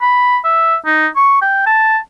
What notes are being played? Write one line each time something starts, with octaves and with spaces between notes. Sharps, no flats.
B5
E5
D#4
C#6
G5
A5